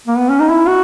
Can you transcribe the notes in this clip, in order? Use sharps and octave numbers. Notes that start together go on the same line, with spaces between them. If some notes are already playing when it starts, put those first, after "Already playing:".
A#3
B3
C#4
D#4
E4
F#4